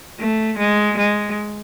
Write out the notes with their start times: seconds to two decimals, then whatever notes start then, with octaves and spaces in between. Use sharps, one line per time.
0.20 A3
0.58 G#3
0.97 G#3